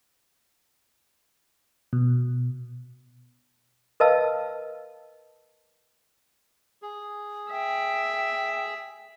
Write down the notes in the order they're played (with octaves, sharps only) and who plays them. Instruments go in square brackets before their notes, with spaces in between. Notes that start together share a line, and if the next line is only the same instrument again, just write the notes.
[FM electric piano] B2
[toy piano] A#4 B4 D#5 F5 A5 E6
[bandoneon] G#4
[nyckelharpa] E5 [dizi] G5